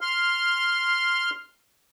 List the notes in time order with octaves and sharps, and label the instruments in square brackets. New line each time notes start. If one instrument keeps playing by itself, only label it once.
[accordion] C6 F6